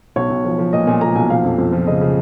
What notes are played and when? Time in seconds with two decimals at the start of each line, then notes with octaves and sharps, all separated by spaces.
0.16 B1 C#5
0.30 B1
0.45 F3
0.59 F3
0.73 A#2 D#5
0.87 A#2 G#5
1.01 A#2 A#5
1.15 B1 G#5
1.30 F3 F5
1.44 F2
1.58 F2
1.73 F3
1.86 C#3 D#5
2.01 C#3